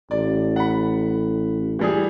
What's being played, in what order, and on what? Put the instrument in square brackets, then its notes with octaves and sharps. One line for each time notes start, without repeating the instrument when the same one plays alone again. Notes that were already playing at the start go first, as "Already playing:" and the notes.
[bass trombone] A1 [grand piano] D5
[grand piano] F#5 B5
E3 G3 G#4